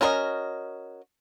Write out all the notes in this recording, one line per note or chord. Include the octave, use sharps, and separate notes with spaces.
C#4 F#4 A#4 C#5 D#5